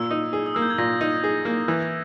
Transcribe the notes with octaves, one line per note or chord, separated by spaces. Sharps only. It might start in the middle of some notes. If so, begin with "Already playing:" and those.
Already playing: A#2 E6
D#4
G#4
D#6
A#3 E6
G6
G#6
A#2 A#6
D#4
G#4
A#3
E3